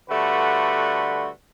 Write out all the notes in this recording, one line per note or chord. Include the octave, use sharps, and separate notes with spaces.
D3 G3 A3 F#4 B4